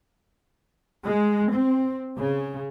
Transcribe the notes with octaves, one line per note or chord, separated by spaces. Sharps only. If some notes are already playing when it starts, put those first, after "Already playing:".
G#3
C4
C#3